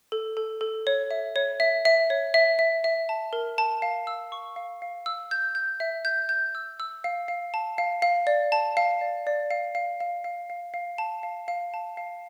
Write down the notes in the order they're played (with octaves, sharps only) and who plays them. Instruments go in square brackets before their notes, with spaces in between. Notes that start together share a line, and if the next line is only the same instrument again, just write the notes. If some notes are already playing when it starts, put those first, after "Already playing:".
[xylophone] A4
A4
A4
C#5
E5
C#5
E5
E5
C#5
E5
E5
E5
A5
A#4
A5
F5
E6
C#6
F5
F5
E6
G6
G6
E5
G6
G6
E6
E6
F5
F5
A5
F5
F5
D5
A5
F5
D5
D5
F5
F5
F5
F5
F5
F5
A5
F5
F5
A5
F5